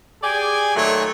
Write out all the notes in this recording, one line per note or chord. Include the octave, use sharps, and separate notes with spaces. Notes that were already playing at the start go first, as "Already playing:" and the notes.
G4 G#4 D5 G#5
A#2 D#3 F#3 A3 C#5